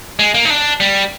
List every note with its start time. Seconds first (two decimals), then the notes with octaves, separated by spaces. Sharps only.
0.19 G#3
0.34 A#3
0.45 D#4
0.50 D4
0.80 G3